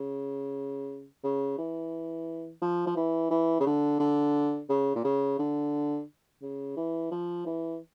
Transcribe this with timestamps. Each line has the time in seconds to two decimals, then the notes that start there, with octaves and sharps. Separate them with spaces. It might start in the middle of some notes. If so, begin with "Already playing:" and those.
Already playing: C#3
1.24 C#3
1.58 E3
2.62 F3
2.87 F3
2.97 E3
3.31 E3
3.60 C#3
3.66 D3
4.00 D3
4.69 C#3
4.96 A#2
5.05 C#3
5.39 D3
6.42 C#3
6.77 E3
7.11 F3
7.46 E3